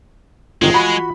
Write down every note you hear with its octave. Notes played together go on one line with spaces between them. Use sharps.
G1 D#3 E3 G#3 F4
F#4 B5